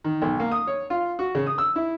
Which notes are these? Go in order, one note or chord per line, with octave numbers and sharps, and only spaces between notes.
D#3
B1
A#3
D#6
C#5
F4
F#4
C#3
D#6
E6
E4